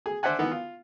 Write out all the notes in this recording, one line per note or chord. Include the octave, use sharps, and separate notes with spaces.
G#4
D4 C5 D5 E5 F#5 G#5
D#3 E3 B3
F4